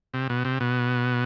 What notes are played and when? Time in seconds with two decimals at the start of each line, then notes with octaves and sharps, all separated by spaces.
0.14 C3
0.30 B2
0.45 C3
0.60 B2